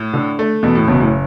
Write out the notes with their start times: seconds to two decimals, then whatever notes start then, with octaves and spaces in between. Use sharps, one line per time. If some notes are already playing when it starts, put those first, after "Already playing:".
Already playing: A2
0.13 D3
0.39 A3
0.63 E2 B2
0.75 A2
0.88 F#1 B2
1.00 A2